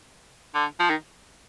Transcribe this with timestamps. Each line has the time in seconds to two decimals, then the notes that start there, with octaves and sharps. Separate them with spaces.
0.55 D3
0.80 F3
0.90 D#3